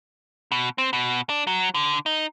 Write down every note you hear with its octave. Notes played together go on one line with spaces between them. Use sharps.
B2
C4
B2
D4
F#3
D3
D#4